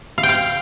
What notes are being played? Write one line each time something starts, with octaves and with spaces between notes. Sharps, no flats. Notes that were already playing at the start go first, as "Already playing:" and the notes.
F5
G5
F5